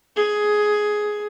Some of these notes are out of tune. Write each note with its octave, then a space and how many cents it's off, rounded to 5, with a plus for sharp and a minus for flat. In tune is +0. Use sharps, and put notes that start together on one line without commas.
G#4 +10